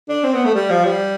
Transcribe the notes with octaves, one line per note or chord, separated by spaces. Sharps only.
D4
C4
B3
A3
G3
F3
G3